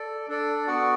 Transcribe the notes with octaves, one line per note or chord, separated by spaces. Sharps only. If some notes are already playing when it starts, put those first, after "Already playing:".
Already playing: A4 D5
D4 A4 D5
B3 F#4 D5 F#5